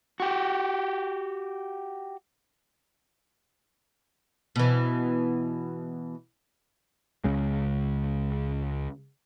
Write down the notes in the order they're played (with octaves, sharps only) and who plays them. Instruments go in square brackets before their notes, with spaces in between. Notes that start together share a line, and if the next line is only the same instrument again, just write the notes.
[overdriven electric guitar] F#4 G4
[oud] B2 E3
[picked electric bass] C#2 C#3 G#3